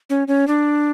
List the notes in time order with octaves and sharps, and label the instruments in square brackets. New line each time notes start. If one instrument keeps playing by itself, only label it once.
[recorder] C#4
C#4
D4